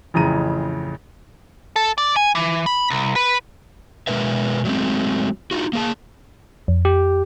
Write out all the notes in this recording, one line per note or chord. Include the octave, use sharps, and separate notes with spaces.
A1 F2 C#3 E4 A#5 D#7
A4
D5
G#5
E3
B5
C2
B4
B2 G#3 A#4 B4 E5
F#3 G#3 A3 C4
D#4 F4 F#4
A#3 G#4 A5
F2
G4